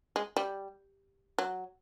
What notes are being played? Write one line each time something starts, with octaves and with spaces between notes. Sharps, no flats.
G#3
G3
F#3